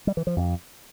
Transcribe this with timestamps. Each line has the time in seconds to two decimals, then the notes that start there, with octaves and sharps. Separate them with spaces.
0.07 G3
0.17 E3
0.27 F3
0.37 F2